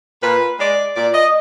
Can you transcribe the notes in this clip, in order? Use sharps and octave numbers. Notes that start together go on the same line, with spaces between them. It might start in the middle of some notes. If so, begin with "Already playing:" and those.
A#2 B4
G#3 D5
A#2 D5
D#5